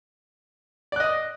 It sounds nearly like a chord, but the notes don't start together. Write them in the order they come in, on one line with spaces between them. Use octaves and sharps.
D5 F#6 D#5